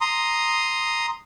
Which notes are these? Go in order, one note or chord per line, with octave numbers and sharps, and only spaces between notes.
A#5 C6 D#6